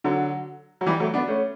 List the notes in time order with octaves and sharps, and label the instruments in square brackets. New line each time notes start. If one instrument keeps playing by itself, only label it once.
[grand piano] D3 F#3
F#3
E3 G3
F#3 A3
B3 D4
A3 C#4